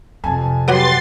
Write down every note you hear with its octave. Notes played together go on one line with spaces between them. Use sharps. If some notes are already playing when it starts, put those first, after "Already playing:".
F2 C3 G#5 A5
F#3 F#4 G4 B4 C#5 C6 A6